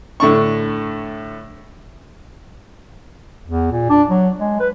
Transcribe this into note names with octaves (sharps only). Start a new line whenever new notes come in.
A2 D3 D4 C#6
E2
A#2
D4
F#3
G#3
B4